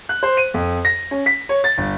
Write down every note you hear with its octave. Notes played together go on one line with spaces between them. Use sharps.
F#6
C5
D#7
F2
A#6
C#4
B6
C#5
A6
G1